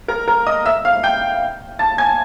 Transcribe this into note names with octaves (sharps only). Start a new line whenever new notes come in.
A#4 A#5
A#4 A#5
D#5 D#6
E5 E6
F5 F6
G5 G6
A5 A6
G#5 G#6